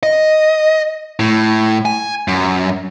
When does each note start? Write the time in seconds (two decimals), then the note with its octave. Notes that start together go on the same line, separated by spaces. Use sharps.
0.03 D#5
1.19 A2
1.85 G#5
2.28 F#2